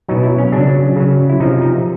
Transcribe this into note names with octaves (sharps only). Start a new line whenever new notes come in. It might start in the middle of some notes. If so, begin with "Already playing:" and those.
B2 F#3 D#4
E4
C#4
C#3 F#3 D4
C#3 F#3
E4
C3 F3 D#4
D#4